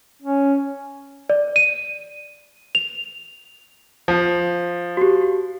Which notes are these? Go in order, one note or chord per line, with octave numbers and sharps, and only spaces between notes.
C#4
D5
D#7
F7
F3
F#4 G4